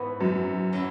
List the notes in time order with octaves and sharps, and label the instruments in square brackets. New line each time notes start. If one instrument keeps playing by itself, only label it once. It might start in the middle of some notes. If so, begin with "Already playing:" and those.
Already playing: [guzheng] G#2 E3 B3
[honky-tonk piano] F#2
[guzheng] F#3 C#4 E4